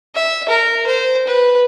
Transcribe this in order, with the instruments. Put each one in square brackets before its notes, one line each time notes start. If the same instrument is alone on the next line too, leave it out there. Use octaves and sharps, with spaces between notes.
[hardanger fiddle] E5
A#4
C5
B4